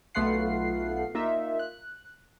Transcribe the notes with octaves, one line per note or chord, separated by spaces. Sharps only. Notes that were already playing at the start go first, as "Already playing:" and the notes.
B1 A3 B3 F4 F#5 C7
A#3 D#4 F4 E5
F#6